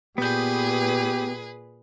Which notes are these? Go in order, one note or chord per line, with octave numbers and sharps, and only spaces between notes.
A#2 B3 G4 G#4 B4 G6